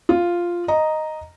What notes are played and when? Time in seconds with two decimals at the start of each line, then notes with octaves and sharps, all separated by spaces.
0.09 F4
0.68 D#5 A#5